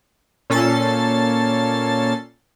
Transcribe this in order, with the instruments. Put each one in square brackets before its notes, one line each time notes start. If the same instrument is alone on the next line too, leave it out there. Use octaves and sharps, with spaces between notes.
[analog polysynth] A#2 C#4 A4 A6 C7